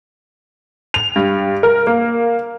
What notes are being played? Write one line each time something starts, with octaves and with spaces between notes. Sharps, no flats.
F7
G2
A#4
A#3